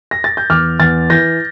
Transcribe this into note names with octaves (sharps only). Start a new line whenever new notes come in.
A#6
A6
G6
E2 D6 F6
E2 F6 A6
E3 G6 A#6